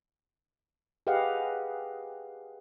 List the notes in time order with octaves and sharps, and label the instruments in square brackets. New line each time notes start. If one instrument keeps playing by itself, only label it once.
[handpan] G4 G#4 B4 D#5 F5 F#5